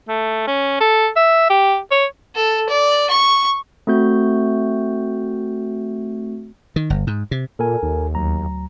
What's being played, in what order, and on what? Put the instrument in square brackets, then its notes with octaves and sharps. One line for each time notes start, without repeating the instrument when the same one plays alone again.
[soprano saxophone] A3
C#4
A4
E5
G4
C#5
[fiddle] A4
D5
C#6
[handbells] A3 C4 F#4 G6
[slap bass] D#3
G1
G#2
C3
[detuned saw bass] A#2 [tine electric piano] A4 A#4 G#5
[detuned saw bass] D#2
[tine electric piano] D2 F#3 A#5